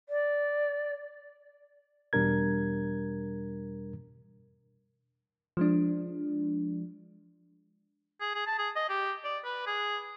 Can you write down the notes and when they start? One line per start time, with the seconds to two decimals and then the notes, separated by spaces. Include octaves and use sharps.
0.09 D5
2.13 E2 B2 G3 D4 A#4 G#6
5.57 F3 G#3 D4
8.21 G#4
8.35 G#4
8.47 A5
8.59 G#4
8.76 D#5
8.89 G4
9.24 D5
9.45 B4
9.67 G#4